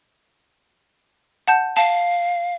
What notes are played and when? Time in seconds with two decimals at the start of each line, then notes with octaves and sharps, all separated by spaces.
1.48 F#5 A5 G6
1.77 F5 A5